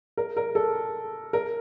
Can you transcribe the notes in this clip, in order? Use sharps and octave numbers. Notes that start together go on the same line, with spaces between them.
A#4
A#4
A4
A#4